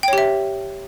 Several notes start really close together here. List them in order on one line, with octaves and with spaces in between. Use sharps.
G5 C#5 G4 E5